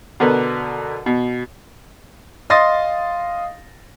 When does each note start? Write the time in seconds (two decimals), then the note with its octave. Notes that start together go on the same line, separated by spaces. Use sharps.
0.20 B2 D3 A#4 B4
1.06 B2
2.50 D#5 F5 C6 D#6 A6 A#6